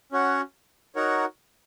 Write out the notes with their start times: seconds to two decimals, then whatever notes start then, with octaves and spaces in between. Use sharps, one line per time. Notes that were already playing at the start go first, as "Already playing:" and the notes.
0.12 C#4 F#4 C#5 F#5
0.95 D#4 F#4 A#4 C#5 F#5